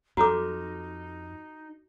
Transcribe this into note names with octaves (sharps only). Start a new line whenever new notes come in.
F2 D#4 F#4 A4 A#5 D6